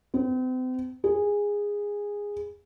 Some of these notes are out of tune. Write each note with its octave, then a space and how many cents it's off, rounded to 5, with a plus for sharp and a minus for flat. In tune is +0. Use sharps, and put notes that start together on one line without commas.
C4 -40
G#4 -15